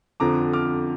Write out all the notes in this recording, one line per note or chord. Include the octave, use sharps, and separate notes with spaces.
F2 D3 F3 A#5 D6
D6 F6